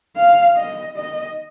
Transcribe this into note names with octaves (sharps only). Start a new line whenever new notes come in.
F5
D#5
D#5